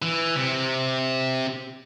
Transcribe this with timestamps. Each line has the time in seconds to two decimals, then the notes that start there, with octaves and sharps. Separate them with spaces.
0.02 E3
0.36 C3